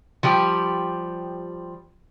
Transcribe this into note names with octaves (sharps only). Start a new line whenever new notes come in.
F3 G3 G4